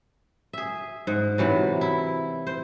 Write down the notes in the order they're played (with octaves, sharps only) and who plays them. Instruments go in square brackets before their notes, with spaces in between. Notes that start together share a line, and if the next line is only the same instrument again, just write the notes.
[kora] G#4 E5
G#2
C3 E3 F#3
E4
C5